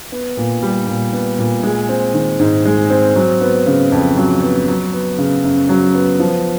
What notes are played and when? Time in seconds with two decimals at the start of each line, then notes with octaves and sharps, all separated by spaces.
0.12 B3
0.37 A#2
0.63 G3
0.88 A#2
1.13 B3
1.39 A#2
1.63 G#3
1.89 C4
2.14 D#3
2.39 G#2
2.65 G#3
2.90 C4
3.16 F#3
3.41 B3
3.67 C#3
3.92 F2
4.17 F#3
4.43 B3
4.68 F#3
4.93 B3
5.18 C#3
5.44 F#2
5.69 F#3
5.94 B3
6.19 F3